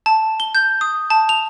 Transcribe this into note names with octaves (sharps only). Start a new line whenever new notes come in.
A5
G7
G6
D#6
A5
F7